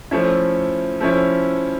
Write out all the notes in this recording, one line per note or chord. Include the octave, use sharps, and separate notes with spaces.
F3 A3 C#4 E4
F3 A3 C#4 E4